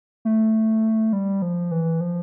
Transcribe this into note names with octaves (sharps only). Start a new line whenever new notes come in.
A3
G3
F3
E3
F3